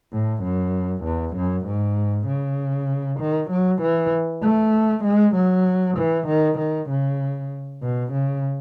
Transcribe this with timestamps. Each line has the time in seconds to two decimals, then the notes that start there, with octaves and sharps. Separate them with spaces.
0.13 A2
0.43 F#2
1.04 E2
1.36 F#2
1.66 G#2
2.27 C#3
3.20 D#3
3.50 F#3
3.82 E3
4.43 A3
5.04 G#3
5.35 F#3
5.98 E3
6.27 D#3
6.59 D#3
6.89 C#3
7.82 B2
8.12 C#3